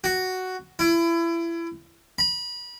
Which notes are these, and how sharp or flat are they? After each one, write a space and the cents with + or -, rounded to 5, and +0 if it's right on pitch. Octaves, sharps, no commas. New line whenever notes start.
F#4 +5
E4 +30
B5 -30